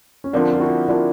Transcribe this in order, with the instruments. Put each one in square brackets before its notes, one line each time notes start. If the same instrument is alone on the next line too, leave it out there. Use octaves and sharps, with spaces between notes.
[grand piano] C#4
[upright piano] D3 F3 A#3 [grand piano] C4 D4
[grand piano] F4
E4 F#4
[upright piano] D3 F3 A#3 [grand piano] D4 E4